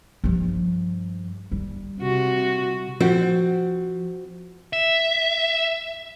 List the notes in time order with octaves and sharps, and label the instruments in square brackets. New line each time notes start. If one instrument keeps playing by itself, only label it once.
[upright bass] G2 F3
G3
[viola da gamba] C3 F#4
[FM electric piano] F3 [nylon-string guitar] C4 F#4
[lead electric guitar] E5